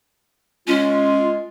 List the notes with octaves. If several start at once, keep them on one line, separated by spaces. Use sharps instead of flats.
G#3 C#4 F4